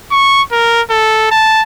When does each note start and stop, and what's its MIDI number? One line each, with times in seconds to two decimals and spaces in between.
0.12 0.42 85
0.52 0.81 70
0.90 1.28 69
1.31 1.63 81